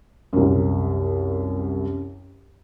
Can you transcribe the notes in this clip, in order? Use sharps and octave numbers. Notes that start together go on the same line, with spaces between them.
C2 F#2